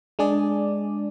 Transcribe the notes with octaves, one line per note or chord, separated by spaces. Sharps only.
G#3 D4 G#4 D5